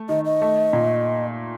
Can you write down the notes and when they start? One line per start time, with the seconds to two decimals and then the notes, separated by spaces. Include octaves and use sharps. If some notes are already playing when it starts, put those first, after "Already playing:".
Already playing: A3
0.09 D#3 D#5
0.25 D#5
0.42 A3
0.73 A#2